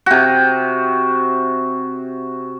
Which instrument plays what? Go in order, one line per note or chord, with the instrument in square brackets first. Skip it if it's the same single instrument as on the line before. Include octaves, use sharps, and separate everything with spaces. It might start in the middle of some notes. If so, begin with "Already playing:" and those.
[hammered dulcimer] C3 F#4